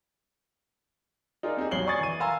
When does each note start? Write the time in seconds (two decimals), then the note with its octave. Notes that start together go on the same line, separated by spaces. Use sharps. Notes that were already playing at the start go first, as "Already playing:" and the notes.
1.43 D#4 F4 G#4 A#4 D5
1.57 C4 D#4 G4 G#4
1.71 B1 F2 C#5 C7 F#7 G7
1.87 D5 G#5 C#6 D#6 G#6 A6
1.99 E3 D#7
2.20 F5 G#5 A#5 C6 E6